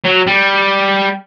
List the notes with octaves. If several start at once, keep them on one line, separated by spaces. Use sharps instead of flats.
F#3
G3